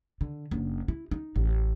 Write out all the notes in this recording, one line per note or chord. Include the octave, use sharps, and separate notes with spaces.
D3
F#1 D4
E4
D#4
A1